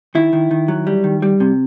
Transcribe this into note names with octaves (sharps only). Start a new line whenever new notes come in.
D#3 E4
D#3
D#3
F#3
G3
D#3
G3
C3